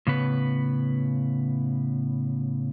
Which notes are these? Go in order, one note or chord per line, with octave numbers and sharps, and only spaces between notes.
A2 C#3 B3 B4